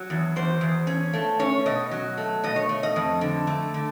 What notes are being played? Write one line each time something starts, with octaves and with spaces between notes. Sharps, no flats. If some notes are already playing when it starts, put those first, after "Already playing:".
Already playing: F#3
E2
E2 C5
E2
C#4
A3
C#4 C#5
B2 D#5
F#3
A3
B2 D#5
C#5
A3
D#5
F2
D3
A3
D3